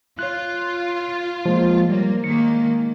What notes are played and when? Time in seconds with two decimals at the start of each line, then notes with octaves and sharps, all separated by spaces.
0.19 F4 C#5 F#6
1.46 F3 G#3 A#3
1.89 G3 A#3 C#5
2.24 D#3 G#3 A#3 C#7